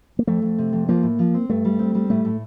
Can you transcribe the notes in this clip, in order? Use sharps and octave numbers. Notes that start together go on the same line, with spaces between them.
A#3
F2 A3
F2
C3
F2
F3 A#3
A2
F3
C4
G2 A3
G3
C4
G3
A2 A3
A2